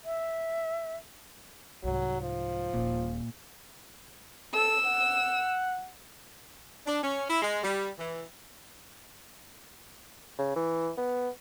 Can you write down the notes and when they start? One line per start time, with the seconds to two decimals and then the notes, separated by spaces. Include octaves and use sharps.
0.05 E5
1.84 C2 G#2 F#3
2.22 F3
2.74 D#1 A#1 A#2
4.54 A4 E6
4.86 F#5
6.86 D4
7.03 C#4
7.29 E4
7.42 G#3
7.64 G3
7.98 E3
10.39 C#3
10.56 E3
10.98 B3